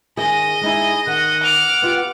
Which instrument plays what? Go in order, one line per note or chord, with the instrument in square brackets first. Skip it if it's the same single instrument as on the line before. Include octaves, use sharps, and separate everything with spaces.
[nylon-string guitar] D#3 G#4 [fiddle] D#5
[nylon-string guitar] G#3 D#4 E4 [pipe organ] G#4
[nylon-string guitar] D#3 [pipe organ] F#5
[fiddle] D6 F6
[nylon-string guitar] B3 F4 G4